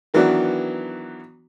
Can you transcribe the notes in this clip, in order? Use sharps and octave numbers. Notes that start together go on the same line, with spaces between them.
D#3 E3 F#3 B3 D4 F#4